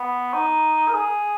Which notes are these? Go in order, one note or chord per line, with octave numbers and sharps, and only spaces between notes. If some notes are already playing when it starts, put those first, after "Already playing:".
Already playing: B3
D#4
A#4
G#4